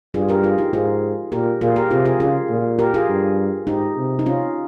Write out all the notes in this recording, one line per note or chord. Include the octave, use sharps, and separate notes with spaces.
G2 F4 G#4
G4 A#4
F4 G#4
D#4 G4
G#2 F4 G#4
A#2 G4 A#4
A#2 F4 G#4
G4 A#4
C3 F4 G#4
F4 G#4
C#3 F4 G#4
A#2
G4 A#4
F4 G#4
G2
G#2 D#4 G4
C3
D#4
C#4 F4